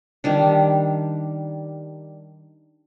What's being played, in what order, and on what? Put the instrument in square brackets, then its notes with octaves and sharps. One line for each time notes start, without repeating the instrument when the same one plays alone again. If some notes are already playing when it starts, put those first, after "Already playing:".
[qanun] D#3 G3 D4